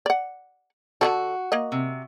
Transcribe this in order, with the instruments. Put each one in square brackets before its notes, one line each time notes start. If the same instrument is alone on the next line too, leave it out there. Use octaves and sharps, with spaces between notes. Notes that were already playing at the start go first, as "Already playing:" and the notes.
[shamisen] D5 F#5
[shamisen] D3 G#3 A4 [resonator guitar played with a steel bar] F#4
[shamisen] A#3 D#5
[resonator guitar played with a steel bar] C3